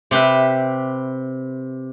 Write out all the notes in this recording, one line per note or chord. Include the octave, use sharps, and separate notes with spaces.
C3 G4 B4 E5